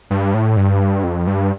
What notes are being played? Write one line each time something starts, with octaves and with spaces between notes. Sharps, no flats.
G2
A2
G2
F2
G2